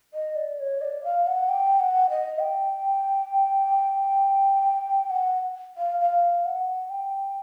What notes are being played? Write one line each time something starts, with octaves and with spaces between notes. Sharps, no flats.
D#5
D5
C#5
D#5
D5
F5
F#5
G5
F#5
D#5
G5
F#5
F5
F5
F#5
G5